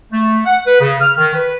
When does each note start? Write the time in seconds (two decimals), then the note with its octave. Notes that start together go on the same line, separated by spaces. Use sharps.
0.12 A3
0.45 F#5
0.67 B4
0.81 C#3
1.00 F6
1.18 D#3
1.34 B4